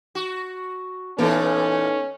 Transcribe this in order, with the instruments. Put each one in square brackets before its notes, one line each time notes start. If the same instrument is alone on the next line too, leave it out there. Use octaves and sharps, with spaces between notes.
[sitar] F#4
[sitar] A#2 E3 A#4 [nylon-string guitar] B3 D#4 A4 [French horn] C#4